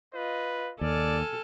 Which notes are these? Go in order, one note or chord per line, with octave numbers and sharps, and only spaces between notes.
F4 B4 D#5
D#2 A4 D5 G#5 F6